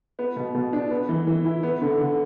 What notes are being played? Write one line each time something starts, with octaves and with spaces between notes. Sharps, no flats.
B3
B2
B2
D4
B3
E3
E3
E4
B3
D3
D3